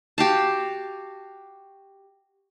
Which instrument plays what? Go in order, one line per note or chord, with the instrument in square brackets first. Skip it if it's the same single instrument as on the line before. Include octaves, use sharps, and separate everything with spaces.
[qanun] F#4 G4 F5 A5